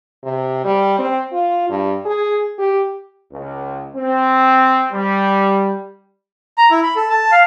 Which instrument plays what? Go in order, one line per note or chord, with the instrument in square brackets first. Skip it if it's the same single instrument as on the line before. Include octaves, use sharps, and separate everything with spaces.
[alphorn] C3
G3
C4
F4
G2
G#4
G4
[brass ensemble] C#2
C4
G3
[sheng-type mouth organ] A#5
E4
B5
A4
A5
F5